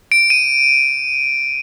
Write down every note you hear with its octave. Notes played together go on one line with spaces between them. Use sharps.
D7
D#7